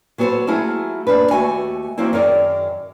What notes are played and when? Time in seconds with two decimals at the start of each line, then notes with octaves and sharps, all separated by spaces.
0.18 F#3 B3 F#4 G#4 A4 C5
0.47 F#3 A3 E4 F4 G#4
1.07 F#2 A#3 D4 B4
1.31 D#2 A3 F#4 G#5
1.98 F3 F#3 A#3 C4 E4
2.13 F#2 D#3 G#4 A#4 D5